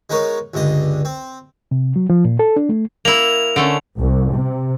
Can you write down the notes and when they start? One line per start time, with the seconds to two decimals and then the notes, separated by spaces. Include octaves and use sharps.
0.10 G#3 B3 D#4 A#4 C#5
0.54 C#2 G2 D3 D#5
1.05 C4
1.71 C3
1.96 F#3
2.10 F3
2.25 A#2
2.39 A4
2.56 D4
2.69 A3
3.05 A#3 E4 F7
3.56 D3 A3 C#4
3.98 C2
4.33 C3